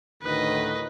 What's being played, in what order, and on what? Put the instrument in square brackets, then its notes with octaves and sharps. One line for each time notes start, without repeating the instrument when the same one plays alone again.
[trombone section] D2 A2 D#3 [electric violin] B4 D#5